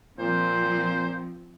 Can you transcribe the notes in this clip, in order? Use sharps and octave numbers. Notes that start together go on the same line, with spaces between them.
A#2 F3 C4 C5